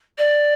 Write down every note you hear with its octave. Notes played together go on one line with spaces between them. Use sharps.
D5